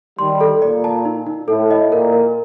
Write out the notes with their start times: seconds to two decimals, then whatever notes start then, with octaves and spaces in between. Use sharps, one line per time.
0.19 D#3 G3 C6
0.41 A4
0.62 A#2 D5
0.84 A5
1.05 D#4
1.27 D#4
1.48 A2 A4
1.71 D#5
1.91 A#2 A#4
2.13 A#4